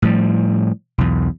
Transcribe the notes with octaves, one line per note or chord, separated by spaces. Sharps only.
A2 F3 G3
B1 E2